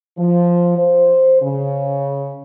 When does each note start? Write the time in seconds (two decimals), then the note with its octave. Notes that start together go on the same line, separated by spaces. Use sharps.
0.18 F3
0.78 C5
1.42 C#3